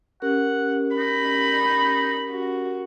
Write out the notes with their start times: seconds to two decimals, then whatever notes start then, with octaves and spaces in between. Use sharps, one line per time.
0.22 C#4 G4 A#4 F#5
0.97 D#4 B5
2.31 F#4